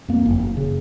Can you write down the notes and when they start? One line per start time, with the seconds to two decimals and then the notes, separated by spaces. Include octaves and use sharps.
0.08 F2 A#3
0.26 F#1
0.40 F#1
0.57 C#3